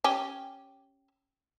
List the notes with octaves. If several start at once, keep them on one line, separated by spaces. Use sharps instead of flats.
C#4 G4